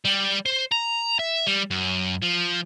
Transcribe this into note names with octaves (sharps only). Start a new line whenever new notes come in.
G3
C5
A#5
E5
G3
F#2
F3